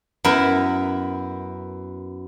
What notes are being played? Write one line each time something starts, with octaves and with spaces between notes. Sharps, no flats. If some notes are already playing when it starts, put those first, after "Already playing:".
F#2 B3 E4 A#4 E5